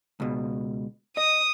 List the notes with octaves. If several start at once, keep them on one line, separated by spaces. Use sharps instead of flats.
C#2 B2
D#5 D#6